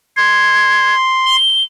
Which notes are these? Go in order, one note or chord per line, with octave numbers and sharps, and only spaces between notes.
C6 G#6
G7